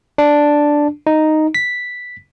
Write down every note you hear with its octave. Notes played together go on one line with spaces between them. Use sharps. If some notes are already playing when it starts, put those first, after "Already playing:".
D4
D#4
B6